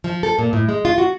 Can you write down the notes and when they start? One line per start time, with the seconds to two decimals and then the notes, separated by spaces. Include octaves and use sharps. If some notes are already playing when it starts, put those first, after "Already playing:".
0.04 F3
0.23 A4
0.39 A#2
0.53 A2
0.69 G#3
0.85 F4
0.98 F#4